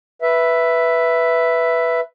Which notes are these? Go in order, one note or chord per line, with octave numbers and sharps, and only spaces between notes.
B4 E5